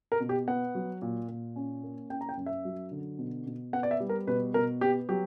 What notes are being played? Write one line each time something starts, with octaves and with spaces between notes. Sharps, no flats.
A#4
B2
G4
B3 F#5
F#3
A#2
A#2
C#4
A#3
C#4 G5
A#5
G5
F#2
E5
F#3
D3
B2
B2
B3 F#5
D5
E5
G3
A#4
B2 B4
B2 A#4
B3 G4
F#3 G4